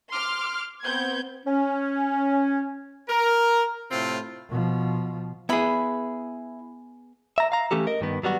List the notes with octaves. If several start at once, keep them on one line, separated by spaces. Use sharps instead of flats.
C6 D6 F6
B3 C4 G6 G#6
C#4
A#4
A2 C3 C4 F4
B2 F3
B3 E4 G#4 B5
E5 A#5
F5 A#5
E3 A3 C#4 G4 A4
A#4 D#5
G2 D#3 B3
F#3 G3 B3 F#4